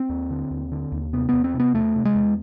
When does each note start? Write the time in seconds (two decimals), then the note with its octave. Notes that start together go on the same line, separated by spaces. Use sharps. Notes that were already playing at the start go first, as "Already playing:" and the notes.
Already playing: C4
0.09 D#2
0.30 D3
0.51 D#2
0.72 D3
0.92 D#2
1.13 C3 B3
1.29 E2 B3
1.44 C4
1.54 C3
1.60 B3
1.74 E2 A3
1.95 C3
2.05 G#3
2.15 E2